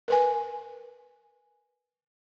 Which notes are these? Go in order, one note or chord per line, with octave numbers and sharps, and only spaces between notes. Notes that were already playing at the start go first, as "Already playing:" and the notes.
A#4 B4 G#5